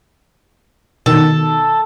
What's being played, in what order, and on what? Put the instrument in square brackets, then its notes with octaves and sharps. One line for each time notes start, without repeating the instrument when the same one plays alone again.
[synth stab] B2 D#3 [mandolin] A4